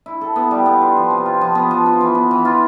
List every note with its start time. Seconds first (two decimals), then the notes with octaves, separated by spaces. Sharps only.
0.06 E4
0.21 A4
0.36 B3
0.51 G3
0.66 B3
0.81 F4
0.97 F3
1.10 C3
1.26 F4
1.41 F3
1.55 B3
1.71 F3
1.86 F4
2.01 E3
2.15 B3
2.31 E3
2.45 F4